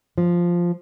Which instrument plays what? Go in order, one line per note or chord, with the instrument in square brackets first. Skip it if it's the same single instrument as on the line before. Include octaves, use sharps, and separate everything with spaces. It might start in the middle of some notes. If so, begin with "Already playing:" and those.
[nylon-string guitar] F3